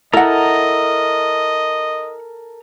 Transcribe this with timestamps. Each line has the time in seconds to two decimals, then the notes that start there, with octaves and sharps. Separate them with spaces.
0.13 E4 A4 A#4 D#5 F#5 A#5